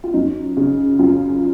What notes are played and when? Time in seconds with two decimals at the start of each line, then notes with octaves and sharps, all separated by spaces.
0.04 F4
0.14 F#2 D#4
0.57 C#3
0.99 F#2 F4